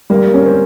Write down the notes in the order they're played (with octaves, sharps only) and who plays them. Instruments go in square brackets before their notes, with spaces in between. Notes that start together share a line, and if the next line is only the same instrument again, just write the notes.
[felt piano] G3 [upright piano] A#3
[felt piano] C#4
[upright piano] C4